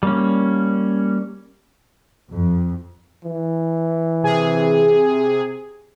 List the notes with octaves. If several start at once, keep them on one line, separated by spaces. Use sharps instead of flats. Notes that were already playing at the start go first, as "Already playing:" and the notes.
G3 A#3 C#4
F2
E3
C3 G#4